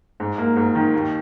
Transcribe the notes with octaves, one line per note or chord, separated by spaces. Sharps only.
G#2
A#3
G#2
D#3
D#2